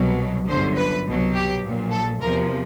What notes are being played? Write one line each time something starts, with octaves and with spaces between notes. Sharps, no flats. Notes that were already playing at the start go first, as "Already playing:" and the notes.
Already playing: C2 B2 F#3
G1 F#2 D3 C5
B4
C2 B2 F#3
G4
A#1 A#2 F#3
A4
E2 C3 F3 A#4